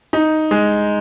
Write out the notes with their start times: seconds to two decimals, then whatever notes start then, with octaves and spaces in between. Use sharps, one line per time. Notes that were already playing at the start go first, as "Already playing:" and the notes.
0.13 D#4
0.51 G#3